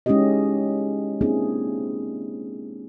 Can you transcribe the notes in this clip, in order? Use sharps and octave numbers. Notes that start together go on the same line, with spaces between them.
G#3 C#4 D#4 E4 G4 D#5
A#3 C4 D4 E4 G#4